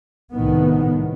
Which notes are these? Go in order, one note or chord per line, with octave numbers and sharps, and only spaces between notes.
C2 A2 D#3 B3